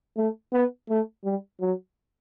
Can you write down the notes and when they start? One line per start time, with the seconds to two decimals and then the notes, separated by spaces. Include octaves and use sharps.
0.17 A3
0.53 B3
0.89 A3
1.25 G3
1.61 F#3